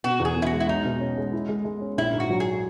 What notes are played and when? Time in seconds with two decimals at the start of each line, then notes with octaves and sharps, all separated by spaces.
0.04 B2 F#4
0.19 E2
0.25 G#4
0.36 E2
0.42 E4
0.46 F#4
0.53 G#3
0.60 E4
0.69 B1 D#4
0.85 B2
1.01 C#4
1.17 G#3
1.33 E4
1.49 G#3
1.65 G#3
1.81 C#4
1.98 A#1 E4
2.13 G#2
2.20 F#4
2.30 F#3
2.40 G#4